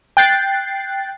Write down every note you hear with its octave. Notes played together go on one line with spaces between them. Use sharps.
G5 F#6 A6 C7